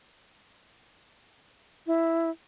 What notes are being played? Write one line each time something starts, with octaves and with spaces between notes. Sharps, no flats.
E4